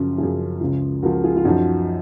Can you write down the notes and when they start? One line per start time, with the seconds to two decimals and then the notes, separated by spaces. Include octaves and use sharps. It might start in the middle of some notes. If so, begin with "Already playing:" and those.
Already playing: F#2 C#3 F3 C#4 F4
0.18 F#2 C#3 F3 F4 G#4
0.61 C#2 C#3 F3
1.03 C#2 C#3 F3 F#4 A#4
1.24 F4 G#4
1.37 F4
1.44 F#2 F3 D#4 F#4